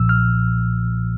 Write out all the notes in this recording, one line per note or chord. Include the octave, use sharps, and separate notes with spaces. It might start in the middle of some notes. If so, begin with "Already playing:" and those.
Already playing: B1 A#2 F3 E6
F6